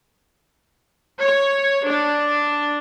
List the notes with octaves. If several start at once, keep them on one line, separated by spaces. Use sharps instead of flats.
C#5
D4